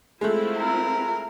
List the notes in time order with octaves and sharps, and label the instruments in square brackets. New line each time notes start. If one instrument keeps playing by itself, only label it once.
[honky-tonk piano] G#3 A3 [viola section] C4 E4 F4
[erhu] A#4